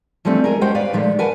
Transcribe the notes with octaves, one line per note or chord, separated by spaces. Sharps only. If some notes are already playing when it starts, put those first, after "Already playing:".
E3 F3 G3 A3 C4 D4
G#3 G#4 A#4
G#3 C#4 F#4 G4 C5 G5
B4 D5 F5
A#2 D#3 F3 G#3 A3
A#4 B4 F#5 G#5 A5